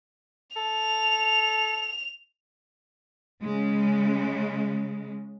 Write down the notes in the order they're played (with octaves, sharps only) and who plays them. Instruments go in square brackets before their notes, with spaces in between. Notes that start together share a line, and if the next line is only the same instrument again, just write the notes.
[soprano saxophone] A4 [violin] F7
[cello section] C#3 G#3